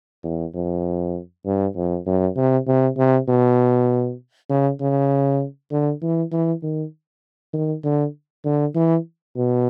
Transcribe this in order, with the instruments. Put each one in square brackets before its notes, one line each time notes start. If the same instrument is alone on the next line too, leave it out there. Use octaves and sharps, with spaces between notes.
[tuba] E2
F2
G2
F2
F#2
C3
C3
C3
B2
C#3
C#3
D3
E3
E3
D#3
D#3
D3
D3
E3
B2